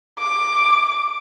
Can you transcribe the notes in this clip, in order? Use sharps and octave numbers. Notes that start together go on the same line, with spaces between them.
D6